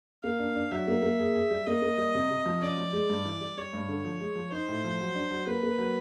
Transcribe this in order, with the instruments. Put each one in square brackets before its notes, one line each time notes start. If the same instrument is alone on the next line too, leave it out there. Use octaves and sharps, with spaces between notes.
[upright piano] A#3 [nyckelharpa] F5
[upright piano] D4
D4
[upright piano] F#3 [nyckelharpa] E5
[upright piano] A#3
A#3
G#4
G#4
G3
[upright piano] A#3 [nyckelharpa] D#5
[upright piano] A#3
G3
C3
C3
F3
[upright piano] C#4 [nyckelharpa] D5
[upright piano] F3
G#3
G2
E3
G3
[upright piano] G3 [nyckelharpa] C#5
[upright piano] G2
D3
F3
G#3
F3
[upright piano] D#4 [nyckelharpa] C5
[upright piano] A2
F3
F#3
D4
F#3
[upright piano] A#3 [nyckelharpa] B4
[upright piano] A#3
F#3